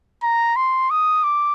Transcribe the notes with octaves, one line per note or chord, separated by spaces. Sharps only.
A#5
C6
D#6
D6